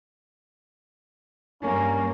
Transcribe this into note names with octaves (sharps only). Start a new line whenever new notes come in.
G2 G3 A#3 C#4